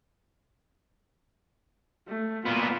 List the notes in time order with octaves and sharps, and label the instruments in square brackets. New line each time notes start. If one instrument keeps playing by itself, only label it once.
[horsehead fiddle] A3
[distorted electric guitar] A#2 B3 [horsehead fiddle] F4 D5